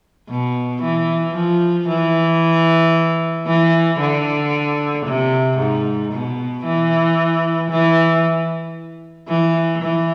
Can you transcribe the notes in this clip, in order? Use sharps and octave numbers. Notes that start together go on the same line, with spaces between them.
B2
E3
F3
E3
E3
D3
C3
G#2
B2
E3
E3
E3
E3